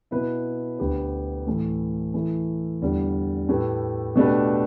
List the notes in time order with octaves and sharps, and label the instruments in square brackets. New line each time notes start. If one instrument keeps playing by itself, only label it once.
[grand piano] B2 B3 E4 B4
D2 D3 B3 G4 B4
A2 E3 A3
E3 A3 E4
E2 D3 G3
A2 A3 G4 B4
B2 A3 D4 G4 B4